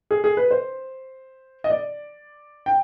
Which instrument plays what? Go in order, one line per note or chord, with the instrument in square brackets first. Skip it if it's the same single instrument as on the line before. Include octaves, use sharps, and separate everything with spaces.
[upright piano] G#4
G#4
B4
C5
D#5
D5
G5